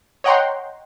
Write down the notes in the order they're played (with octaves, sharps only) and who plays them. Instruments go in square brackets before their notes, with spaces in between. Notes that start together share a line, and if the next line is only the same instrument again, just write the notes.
[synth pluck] C#5 D#5 F#5 G5 A#5 C6